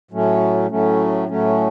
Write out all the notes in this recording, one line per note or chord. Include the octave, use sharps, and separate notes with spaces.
A2 F#3 A3 C#4
A2 F#3 A3 C#4
A2 F#3 A3 C#4